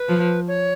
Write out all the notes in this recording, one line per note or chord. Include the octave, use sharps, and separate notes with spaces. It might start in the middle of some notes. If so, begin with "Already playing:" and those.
Already playing: B4
F3
C#5